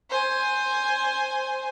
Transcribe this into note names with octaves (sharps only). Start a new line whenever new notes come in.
C5 G#5